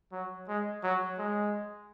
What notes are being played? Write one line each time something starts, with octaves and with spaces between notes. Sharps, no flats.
F#3
G#3
F#3
G#3